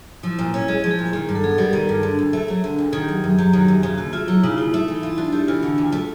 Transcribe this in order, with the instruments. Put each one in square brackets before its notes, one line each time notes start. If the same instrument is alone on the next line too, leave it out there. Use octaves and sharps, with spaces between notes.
[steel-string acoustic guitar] F3 [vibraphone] E4
[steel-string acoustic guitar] A#2
C#4
[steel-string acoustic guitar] G#3 [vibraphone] G#4
[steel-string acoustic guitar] F3
[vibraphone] G#4
[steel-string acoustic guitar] A#2
[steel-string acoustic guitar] D#3 [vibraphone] G#4
[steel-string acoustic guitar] G2
[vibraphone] A4
[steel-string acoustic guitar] B3 [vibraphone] G#4
[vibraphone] A4
[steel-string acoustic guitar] G3 [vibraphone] A#4
[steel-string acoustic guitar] D#3
G2
[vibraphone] G#4
[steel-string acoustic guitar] D3 [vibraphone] A4
[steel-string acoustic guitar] D2
A3
F#3
D3
D2
[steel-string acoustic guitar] D#3 [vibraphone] G#4
[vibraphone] G4
[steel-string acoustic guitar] F#2 [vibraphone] G#4
[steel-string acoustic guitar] F#2
[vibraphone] G#4
[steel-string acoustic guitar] F#3 [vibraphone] G4
[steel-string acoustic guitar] D#3
[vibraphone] F#4
[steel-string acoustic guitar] F#2
[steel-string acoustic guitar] C#3 [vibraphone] G#4
[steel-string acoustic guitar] D#2 [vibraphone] F#4
[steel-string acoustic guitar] A3 [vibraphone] F4
[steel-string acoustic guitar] F#3 [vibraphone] E4
[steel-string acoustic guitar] C#3 [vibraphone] D#4
[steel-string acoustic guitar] D#2 [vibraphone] E4
[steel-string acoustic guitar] A3 [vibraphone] D#4
[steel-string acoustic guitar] E3
[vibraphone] E4
[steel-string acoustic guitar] F4
[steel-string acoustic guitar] D4 [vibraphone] F#4
[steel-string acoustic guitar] A3 [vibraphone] G4
[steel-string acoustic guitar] E3 [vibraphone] F4
[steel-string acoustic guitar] D3 [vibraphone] F#4
[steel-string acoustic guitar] D2
[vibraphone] F4
[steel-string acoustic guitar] A3